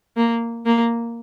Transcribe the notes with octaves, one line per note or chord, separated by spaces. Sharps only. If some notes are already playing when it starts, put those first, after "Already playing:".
A#3
A#3